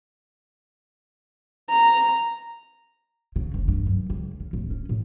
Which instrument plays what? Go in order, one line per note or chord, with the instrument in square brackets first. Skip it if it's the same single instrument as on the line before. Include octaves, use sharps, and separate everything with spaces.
[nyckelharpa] A#5
[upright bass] C#3
F1
G2
F#2
C#2
C#3
D1
C#4
A2